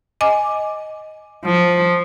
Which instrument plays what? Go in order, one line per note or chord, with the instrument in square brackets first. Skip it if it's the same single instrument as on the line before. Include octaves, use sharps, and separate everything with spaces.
[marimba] D#5 G#5 D6
[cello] F3